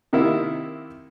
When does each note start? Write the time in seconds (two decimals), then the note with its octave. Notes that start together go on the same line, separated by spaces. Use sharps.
0.13 C3 D#3 A#3 E4